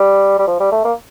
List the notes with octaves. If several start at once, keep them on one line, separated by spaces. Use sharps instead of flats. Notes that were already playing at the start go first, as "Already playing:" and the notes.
Already playing: G3
G3
F3
G3
A3
A#3